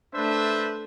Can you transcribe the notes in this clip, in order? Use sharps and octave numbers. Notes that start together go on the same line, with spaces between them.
A3 D4 B4 C5 E5